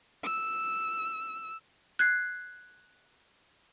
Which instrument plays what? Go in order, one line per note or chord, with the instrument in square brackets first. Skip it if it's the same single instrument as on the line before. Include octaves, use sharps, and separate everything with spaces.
[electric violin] E6
[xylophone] F#6 G#6 C7